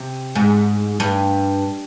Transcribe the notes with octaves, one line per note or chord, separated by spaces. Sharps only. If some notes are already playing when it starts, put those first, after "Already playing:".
Already playing: C3
G#2
G2